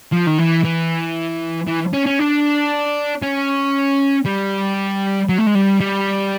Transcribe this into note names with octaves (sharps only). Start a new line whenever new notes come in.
F3
D#3
E3
E3
E3
C#4
C#4
D4
C#4
G3
F#3
A3
G#3
G3
G3